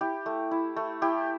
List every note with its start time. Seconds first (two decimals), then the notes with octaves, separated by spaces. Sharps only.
0.01 E4 G4
0.26 A3
0.51 E4
0.76 A3
1.02 E4 G4